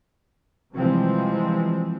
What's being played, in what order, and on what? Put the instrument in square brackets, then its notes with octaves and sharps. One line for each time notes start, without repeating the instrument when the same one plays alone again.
[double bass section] C3 E3 F3 G3 G#3 C4